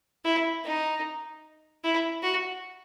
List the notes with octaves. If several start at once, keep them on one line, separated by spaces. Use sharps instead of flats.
E4
D#4
E4
F#4